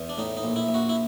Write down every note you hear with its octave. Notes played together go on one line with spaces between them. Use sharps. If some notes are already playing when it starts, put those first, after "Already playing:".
Already playing: E2
D4
A2 D#4
D#4
A#1
E4
A#1
F#4
E4